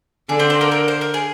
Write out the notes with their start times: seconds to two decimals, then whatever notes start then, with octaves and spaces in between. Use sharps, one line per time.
0.29 D3 G#4
0.39 C4 C5
0.50 C4 C5
0.61 A#3 A#4
0.72 A#3 A#4
0.88 C5
1.01 A#4
1.14 G#4